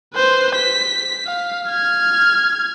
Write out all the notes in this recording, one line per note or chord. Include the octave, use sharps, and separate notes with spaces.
B4 C5
B6
F5
F6 G#6